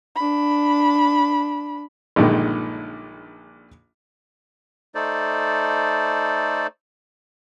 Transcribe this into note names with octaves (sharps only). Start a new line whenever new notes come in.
D4 B5
A#1 G2 A#2 D3 D#3 G#3
A3 D#4 A4 C5 D5